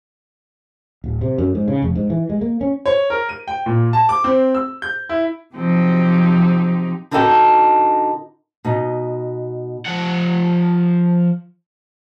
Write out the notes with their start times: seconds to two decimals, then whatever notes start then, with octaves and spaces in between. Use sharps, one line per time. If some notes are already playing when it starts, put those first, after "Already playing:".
1.04 D1
1.21 C3
1.38 F#2
1.55 G#2
1.68 C#3
1.82 F1
1.95 G#2
2.10 E3
2.30 G#3
2.41 A#3
2.61 C#4
2.86 C#5
3.10 A#4
3.29 D#7
3.48 G5
3.66 A#2
3.93 A5
4.09 D6
4.24 C4
4.54 E6
4.82 G6
5.09 E4
5.54 C3 F3 F#3 C4 D#4 G4
7.11 D3 D#4 E4 F#4 A4 G5
8.65 B2 D#4
9.86 F3 F#5